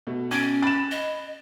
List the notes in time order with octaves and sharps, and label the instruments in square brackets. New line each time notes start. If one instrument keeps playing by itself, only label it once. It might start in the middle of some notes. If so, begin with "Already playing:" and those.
[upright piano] B2 A3
[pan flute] C#4 [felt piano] G#6 A6 D7
[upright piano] B5 F#6 [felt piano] A6 E7
[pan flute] D#5